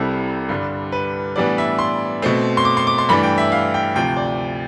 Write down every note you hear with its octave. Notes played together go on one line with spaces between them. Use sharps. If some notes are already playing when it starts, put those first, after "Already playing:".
Already playing: C2 C3 G3 C4 E4 A4
G2 D3 G3
B4
A2 E3 G3 B3 D4 D5
E5
C6
B2 A3 C4
C6
D6
C6
D6
C6
G2 E3 A3 D4 B5
G5
E5
F5
G5
D2 C3 F3 G5
D5